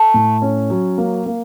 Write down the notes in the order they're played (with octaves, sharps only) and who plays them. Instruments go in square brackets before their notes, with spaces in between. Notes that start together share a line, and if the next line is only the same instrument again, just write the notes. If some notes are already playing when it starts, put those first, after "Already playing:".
Already playing: [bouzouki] A3
[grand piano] A2
C#4
F#3
A#3
A#3